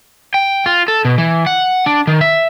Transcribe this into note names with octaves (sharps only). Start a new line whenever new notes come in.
G5
F4
A4
B2
E3
F#5
D4
D#3
E5